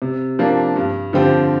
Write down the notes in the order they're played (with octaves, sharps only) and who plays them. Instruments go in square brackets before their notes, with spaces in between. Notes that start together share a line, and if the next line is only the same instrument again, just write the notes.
[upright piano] C3
F3 A#3 D4
G2
D3 F3 C4 G4